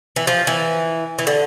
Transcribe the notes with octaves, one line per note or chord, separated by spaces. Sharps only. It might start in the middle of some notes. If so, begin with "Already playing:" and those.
E3
F3
E3
E3
D3